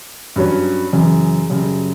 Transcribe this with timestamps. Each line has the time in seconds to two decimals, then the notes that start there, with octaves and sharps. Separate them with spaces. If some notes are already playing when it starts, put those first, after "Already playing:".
0.36 G2 F#3 C#4
0.93 F#2 C#3 E3
1.50 F#2 C#3 G3